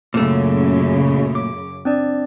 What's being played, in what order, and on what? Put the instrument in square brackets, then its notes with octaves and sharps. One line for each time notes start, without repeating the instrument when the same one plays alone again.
[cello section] F#2 C#3 [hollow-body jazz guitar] A#2 A3
[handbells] D6
C4 D4 D5